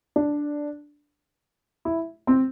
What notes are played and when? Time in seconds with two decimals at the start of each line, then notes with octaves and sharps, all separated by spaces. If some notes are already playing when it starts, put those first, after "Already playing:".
0.16 D4
1.85 E4
2.27 C4